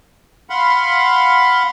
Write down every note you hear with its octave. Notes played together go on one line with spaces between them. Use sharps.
F5 F#5 B5 C6